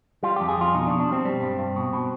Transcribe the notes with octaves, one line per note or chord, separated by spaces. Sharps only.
G3 F4
F2 G4
G#4
F2 F4
B2 D#4
D4
B2
D4
G3 C4
G3
G2
G2
B2
B2